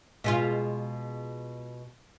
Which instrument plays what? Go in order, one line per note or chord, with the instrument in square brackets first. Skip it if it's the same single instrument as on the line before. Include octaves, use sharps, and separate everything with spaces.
[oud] B2 G#3 F4